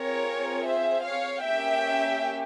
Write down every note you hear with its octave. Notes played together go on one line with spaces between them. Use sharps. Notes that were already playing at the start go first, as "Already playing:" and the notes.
Already playing: C4 F4 G#4 A#4 C#5
C5 E5
C#5 F5
A#3 C#4 G4 E5 G5